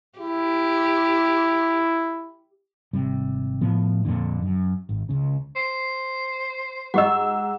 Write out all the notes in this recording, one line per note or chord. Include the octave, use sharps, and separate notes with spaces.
E4 G4
G#1 C3 G3
A2 F3 B3
F2 A#2 D3
F#2
G#1
C#2 C#3
C5
G#2 F#4 G4 D#5 F#5 E6